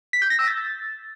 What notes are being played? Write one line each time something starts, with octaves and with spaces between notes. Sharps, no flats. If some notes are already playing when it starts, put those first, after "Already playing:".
B6
G6
A#6
E6
A6